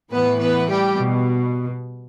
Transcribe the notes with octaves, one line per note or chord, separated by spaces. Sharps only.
A2 E3 B3 B4
B3 B4
G3 G4
B2